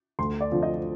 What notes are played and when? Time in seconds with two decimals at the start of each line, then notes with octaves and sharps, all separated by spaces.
0.19 D2 C6
0.41 D5
0.52 D3 F3 C4
0.63 D#5